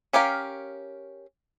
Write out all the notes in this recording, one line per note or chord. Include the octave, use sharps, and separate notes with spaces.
C#4 G4 A#4 F5